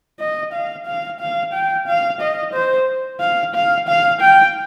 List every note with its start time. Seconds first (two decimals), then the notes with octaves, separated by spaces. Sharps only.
0.20 D#5
0.53 F5
0.86 F5
1.20 F5
1.53 G5
1.87 F5
2.20 D#5
2.53 C5
3.20 F5
3.55 F5
3.88 F5
4.21 G5